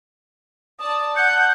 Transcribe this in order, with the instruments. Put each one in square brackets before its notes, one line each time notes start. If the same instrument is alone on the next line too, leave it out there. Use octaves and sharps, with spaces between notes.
[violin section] D5 A5 [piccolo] D#6
[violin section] F#5 [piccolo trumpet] F#6 [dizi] G6 [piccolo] C#7